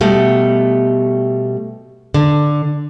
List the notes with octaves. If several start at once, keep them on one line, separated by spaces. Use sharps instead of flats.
B2 G3 A3
D3